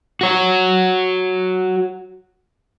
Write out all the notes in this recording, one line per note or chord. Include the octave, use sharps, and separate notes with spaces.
F#4 C#5